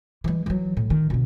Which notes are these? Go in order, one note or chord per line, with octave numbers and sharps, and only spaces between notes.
E3 G#3
E3 F#3
A2
D#3
B2 D3